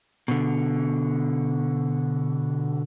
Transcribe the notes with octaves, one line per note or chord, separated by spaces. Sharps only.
B2 D3